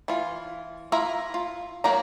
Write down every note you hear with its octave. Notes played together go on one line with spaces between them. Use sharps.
E3 F4
E4 F4 E5 A#5
F4
F#3 A#3 F#4 G4 A#5